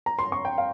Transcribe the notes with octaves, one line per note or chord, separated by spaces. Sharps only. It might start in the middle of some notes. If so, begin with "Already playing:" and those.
A#5
C6
C#6
G5
F5